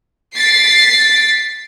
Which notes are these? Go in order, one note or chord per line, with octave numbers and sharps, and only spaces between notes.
A6 B6 C7 D7